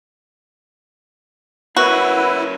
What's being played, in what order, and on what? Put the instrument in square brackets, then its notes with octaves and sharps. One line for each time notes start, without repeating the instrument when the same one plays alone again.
[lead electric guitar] A#3 C#4 [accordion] E4 [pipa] F#4 [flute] B4